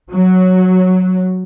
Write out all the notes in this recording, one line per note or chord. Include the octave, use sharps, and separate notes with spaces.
F#3